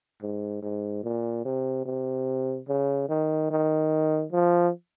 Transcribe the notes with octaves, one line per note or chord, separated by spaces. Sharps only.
G#2
G#2
A#2
C3
C3
C#3
D#3
D#3
F3